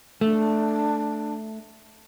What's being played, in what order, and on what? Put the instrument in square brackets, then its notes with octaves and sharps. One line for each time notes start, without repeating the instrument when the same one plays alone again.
[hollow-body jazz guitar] A3 [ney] D4